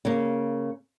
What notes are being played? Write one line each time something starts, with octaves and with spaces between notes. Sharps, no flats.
C#3 A#3